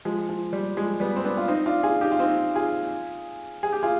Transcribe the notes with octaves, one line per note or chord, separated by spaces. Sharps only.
F3 G#3
F3
G3
F3 G#3
G3 B3
C4
B3 D4
F4
C4 D#4
D4 F4
F4 G#4
D#4 G4
F4
C4 D#4
F4 G#4
G#4
G4
F4 G#4